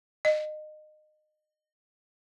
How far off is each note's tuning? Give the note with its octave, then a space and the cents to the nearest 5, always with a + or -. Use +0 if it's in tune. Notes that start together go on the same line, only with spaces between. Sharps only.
D#5 -25